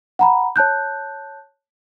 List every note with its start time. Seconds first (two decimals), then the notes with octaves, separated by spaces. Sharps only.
0.19 F#5 A#5 B5
0.56 C#5 A5 F#6 G6